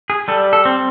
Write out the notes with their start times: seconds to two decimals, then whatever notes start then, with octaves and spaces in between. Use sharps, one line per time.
0.10 G#4
0.28 G3 A4
0.53 A4
0.65 C4